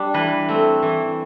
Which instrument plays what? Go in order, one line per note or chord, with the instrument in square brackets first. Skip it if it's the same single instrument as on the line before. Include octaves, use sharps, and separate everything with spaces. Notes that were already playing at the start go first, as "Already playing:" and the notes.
Already playing: [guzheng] G3 D4
E3 B4
A3 C4
E3